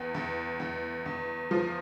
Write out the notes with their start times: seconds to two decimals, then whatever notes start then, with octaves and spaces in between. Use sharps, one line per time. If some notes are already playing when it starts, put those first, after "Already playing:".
Already playing: E2
0.15 E2
0.60 E2
1.06 E2
1.51 F3